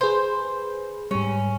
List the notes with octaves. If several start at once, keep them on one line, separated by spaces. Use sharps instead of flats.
G#4 B4 C5
G#2 G3 C#4